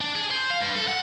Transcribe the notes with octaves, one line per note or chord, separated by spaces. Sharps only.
D4
G#4
C5
F5
G2
A4
F#5